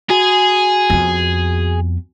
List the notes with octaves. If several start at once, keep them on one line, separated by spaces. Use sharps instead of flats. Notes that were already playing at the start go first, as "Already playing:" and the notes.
F#4 G#4 G#5
F2 B3